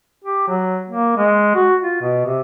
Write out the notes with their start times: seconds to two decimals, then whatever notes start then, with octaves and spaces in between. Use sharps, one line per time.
0.24 G4
0.48 F#3
0.90 A#3
1.17 G#3
1.55 F#4
1.82 F4
2.02 B2
2.26 C3